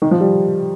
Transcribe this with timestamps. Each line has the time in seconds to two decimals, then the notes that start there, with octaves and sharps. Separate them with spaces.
0.02 D#3
0.11 F3
0.21 G3